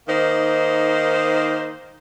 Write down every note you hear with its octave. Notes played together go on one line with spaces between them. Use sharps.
D#3 A#3 D#4 C5